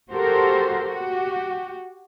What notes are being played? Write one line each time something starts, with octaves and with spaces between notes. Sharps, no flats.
F#4 G4 A4 A#4 C5
F#4 G4